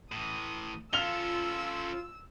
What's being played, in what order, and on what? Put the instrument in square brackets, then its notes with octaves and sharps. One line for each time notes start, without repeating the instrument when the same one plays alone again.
[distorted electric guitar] A2 E3 [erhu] D#6
[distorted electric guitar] C#4 A4 [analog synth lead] F4 [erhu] E6 [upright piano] F6 F7 G7